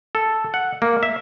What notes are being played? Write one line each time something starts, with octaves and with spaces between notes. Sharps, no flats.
A4
F#5
A#3
E5